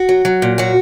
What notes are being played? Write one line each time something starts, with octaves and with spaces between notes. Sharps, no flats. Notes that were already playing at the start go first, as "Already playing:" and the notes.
Already playing: F#4
F#3
F#3
A#2
F#3 F#4